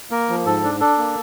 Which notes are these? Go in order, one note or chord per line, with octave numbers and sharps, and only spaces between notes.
A#3 A#4
F3
G#2 A4
D4
D4 A4
A#3